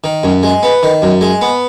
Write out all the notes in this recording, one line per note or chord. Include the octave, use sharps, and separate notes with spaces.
D#3
F#2
G#3
B3
D#3
F#2
G#3
B3